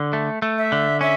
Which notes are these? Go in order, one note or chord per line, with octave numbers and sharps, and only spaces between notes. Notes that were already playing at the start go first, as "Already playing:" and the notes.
Already playing: D3
A3
A3
E5
D3
C#4 E5